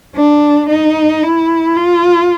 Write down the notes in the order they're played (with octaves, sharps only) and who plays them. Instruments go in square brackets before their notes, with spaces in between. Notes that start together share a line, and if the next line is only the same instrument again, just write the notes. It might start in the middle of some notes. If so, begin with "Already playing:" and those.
[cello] D4
D#4
E4
F4